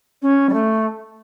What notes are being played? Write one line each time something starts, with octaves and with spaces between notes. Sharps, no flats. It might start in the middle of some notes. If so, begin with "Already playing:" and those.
C#4
G3
A3